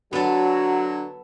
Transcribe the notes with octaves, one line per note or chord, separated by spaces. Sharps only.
D3 F#3 B3 F#4 A4